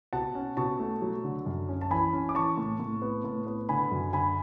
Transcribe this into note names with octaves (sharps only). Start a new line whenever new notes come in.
B2 F#5 A5
C#4
B2 A5 C#6
A3
F#3
D3
F#2
C#4
A5
E3 G#5 B5
C#4
D6
E3 A5 C#6
A2
A2
B3
A2
B3
D3 G#5 B5
F#2
D3 G#5 B5